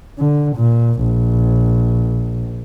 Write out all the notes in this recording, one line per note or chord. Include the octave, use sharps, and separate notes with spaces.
D3
A#2
A#1